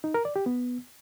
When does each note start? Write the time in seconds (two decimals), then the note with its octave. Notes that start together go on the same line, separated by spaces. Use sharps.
0.04 D#4
0.14 A#4
0.25 D5
0.36 G4
0.46 B3